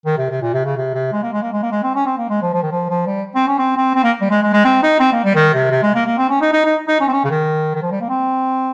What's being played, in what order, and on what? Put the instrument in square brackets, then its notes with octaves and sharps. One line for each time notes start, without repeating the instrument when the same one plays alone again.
[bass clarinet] D#3
C3
C3
A#2
C3
C#3
C3
C3
G#3
A#3
G#3
A#3
G#3
A#3
G#3
C4
C#4
C4
A#3
G#3
F3
F3
D#3
F3
F3
G3
C4
C#4
C4
C4
C4
A#3
G3
G#3
G#3
G#3
C4
D#4
C4
A#3
G3
D#3
C3
C3
G#3
A#3
A#3
C4
C#4
D#4
D#4
D#4
D#4
C#4
C4
C#4
C#3
D#3
D#3
F3
G3
A#3
C4